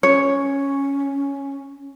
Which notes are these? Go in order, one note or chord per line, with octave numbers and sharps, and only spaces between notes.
C#4 C#5